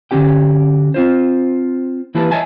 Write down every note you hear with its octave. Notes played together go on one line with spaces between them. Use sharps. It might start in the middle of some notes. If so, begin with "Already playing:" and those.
D3 F#3 C#4 G4 G5
C4 F4 C5
E3 A#3 E4 G4 B4 A5
C#5 D#5 E5 G#5 A5